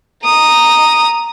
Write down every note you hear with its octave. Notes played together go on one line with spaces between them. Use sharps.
A#5 D#6